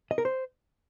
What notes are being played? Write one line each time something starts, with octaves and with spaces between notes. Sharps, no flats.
D#5
A#4
C5